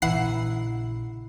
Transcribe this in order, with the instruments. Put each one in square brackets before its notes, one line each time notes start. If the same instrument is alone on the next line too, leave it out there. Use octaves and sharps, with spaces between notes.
[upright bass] A#1 C#3 [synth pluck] E3 F#5 C7 [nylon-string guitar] D#4 E4